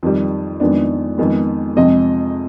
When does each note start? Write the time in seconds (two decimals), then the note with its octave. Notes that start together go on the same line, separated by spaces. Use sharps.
0.03 F2 D#3 G3
0.60 F2 D#3 G#3 B3 D4
1.18 F2 D#3 G#3 B3
1.76 F2 C3 F3 G#3 C4 D#5